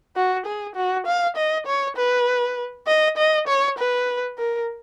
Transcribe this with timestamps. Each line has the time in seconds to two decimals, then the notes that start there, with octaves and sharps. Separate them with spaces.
0.16 F#4
0.46 G#4
0.76 F#4
1.06 F5
1.36 D#5
1.67 C#5
1.97 B4
2.87 D#5
3.17 D#5
3.48 C#5
3.78 B4
4.38 A#4